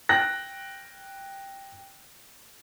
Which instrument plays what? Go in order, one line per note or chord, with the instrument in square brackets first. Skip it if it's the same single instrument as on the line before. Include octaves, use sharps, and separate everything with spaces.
[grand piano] G5 F#6 A#6